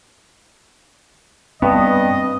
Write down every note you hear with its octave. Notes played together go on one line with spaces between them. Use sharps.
G2 B3 C4 D#5